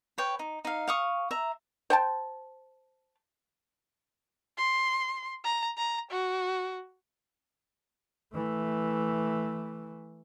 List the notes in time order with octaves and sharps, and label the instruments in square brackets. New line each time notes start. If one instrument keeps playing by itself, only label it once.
[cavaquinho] B4 C#5 G5
D#4
D#4 F5
F5 C#6 D#6
E5 A#5
[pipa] C5 G5 A5
[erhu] C6
A#5
A#5
F#4
[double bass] E3 A3